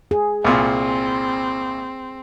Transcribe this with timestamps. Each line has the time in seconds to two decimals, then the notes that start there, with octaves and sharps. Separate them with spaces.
0.11 G#4
0.44 C2 A#2 C4